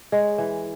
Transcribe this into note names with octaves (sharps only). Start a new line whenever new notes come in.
G#3 C#5
E3